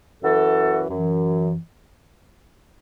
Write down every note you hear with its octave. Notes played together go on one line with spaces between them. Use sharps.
F#2 E3 F#4 A4
F#2 E3